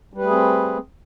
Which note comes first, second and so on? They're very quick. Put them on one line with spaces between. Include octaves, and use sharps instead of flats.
G3 B4 A3 G#4 C4